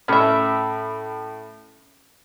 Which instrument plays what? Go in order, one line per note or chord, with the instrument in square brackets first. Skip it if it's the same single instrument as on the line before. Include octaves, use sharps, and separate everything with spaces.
[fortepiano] A2 B5 [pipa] C#4 E5